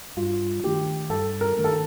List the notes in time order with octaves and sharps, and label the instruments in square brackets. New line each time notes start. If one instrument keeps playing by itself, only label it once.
[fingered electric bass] G2 [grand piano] F4
[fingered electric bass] D#3 A3 D4 [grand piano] G4
[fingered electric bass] G2 [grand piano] A4
[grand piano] A#4
[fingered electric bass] D#3 A3 D4
[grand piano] A4